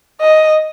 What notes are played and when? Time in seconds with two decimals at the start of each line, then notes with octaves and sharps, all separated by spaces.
0.21 D#5